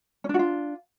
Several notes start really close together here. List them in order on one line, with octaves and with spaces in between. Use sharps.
C#4 D4 F#4 F4